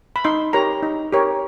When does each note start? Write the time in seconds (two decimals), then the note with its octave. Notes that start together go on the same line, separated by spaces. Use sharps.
0.16 B5
0.24 D#4 C6
0.53 G4 A#4 C#5 A#5
0.83 D#4
1.13 G4 A#4 C#5